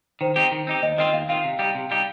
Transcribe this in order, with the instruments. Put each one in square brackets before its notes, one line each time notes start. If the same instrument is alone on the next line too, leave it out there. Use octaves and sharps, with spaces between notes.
[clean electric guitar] D#3 [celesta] C5
[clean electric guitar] C4 D#4 G4
D#3
C4 D#4 G4
[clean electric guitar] D#2 [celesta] D#5
[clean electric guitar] D#3 C4 F4 [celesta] D#5
[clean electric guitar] D#2 [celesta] F5
[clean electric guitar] D#3 C4 F4 [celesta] F5
[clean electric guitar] C3
G3 D#4 G4
C3
G3 D#4 G4